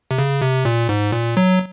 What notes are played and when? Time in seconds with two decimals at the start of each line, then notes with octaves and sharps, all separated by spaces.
0.11 C3
0.18 C#3
0.42 C3
0.65 A#2
0.89 G#2
1.13 A#2
1.37 F#3